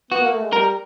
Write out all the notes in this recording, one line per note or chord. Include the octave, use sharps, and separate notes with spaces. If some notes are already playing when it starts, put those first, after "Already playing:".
B3 F#4
A#3
A3
G#3
G3 A#4